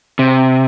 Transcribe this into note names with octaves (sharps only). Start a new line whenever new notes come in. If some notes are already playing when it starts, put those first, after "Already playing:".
C3